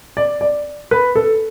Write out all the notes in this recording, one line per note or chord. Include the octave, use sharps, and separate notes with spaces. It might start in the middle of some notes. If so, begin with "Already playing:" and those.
D5
D5
B4
A4